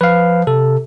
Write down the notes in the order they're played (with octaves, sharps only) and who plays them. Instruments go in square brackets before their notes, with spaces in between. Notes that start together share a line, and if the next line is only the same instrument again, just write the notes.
[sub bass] F3 [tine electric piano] B4 F5
[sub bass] C3 [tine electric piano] A4